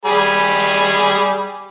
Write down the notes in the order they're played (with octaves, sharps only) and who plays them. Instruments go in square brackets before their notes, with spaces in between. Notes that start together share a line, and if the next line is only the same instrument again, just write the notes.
[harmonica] G3 G#4 B5